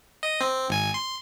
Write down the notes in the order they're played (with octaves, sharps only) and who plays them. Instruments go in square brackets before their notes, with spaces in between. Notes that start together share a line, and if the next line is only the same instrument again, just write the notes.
[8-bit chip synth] D#5
C4
G#1 G#5
C6